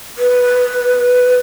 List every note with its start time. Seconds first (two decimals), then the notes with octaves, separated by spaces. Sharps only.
0.18 B4